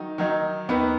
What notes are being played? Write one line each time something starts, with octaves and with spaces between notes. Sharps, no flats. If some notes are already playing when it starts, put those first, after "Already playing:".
Already playing: D#3 F#3 D#4
D#3 F#3 D#4
D#2 D#3 B3 D#4 B4